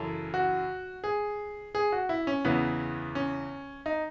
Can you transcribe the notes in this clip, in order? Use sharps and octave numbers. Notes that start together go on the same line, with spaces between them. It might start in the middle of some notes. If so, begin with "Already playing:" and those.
Already playing: F#2 C#3 E3 A4
F#4
G#4
G#4
F#4
E4
C#4
E2 C#3 E3 B3
C#4
D#4